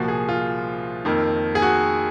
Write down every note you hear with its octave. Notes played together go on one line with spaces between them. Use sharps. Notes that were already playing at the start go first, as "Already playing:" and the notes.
Already playing: C2 A#2 F3 A#3 F#4
G#4
F4
F2 D#3 A#3
G#4
F#4